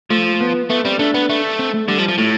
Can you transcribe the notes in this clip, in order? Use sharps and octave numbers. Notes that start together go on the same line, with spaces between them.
F3 A3
B3
A3 B3
G3 C4
A3 D4
B3
A3
C4
A3
D3 G3
F3
F3
A2 A3